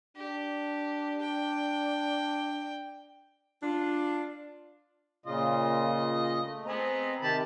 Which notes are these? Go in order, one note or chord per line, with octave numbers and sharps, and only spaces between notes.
D4 G4
G5
D4 F4
A#2 C#3 F4 D#5
A3
B3 C4 G#4 D#5 A#5
C3 D#3 G4 A5 B5